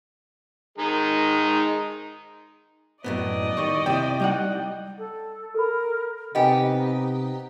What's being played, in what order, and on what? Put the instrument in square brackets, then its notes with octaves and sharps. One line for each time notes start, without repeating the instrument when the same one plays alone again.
[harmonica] D#3 G#3 D#4
[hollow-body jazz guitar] F#2 A2 B3 [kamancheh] D5 D#5
[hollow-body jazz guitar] D#3 G3 [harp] C#6
[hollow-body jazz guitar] C3 E4 [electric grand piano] G5
[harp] G3 D#4 F#5
[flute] A4
[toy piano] A4 B5 [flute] A#4
[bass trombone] C3 [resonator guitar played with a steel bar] B3 G4 [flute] D#4 [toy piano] D#5 G#5